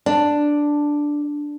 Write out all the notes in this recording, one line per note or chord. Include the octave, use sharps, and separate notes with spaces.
D4